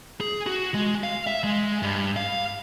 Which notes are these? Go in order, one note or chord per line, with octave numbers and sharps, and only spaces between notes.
G#4
F#4
G#3
F5
E5
G#3
G2
F5